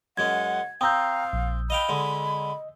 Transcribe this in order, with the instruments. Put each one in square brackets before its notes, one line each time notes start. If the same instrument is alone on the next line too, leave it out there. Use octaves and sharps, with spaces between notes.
[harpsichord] F#2 G#3 C#4 [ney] F#5 [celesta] G#6
[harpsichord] C4 [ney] F5 [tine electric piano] G5 A#5 [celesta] D#6 E6 G6
[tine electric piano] A#1
[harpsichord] D#5 F5 G5 [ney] B5
[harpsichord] D3 G#3 [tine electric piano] D#5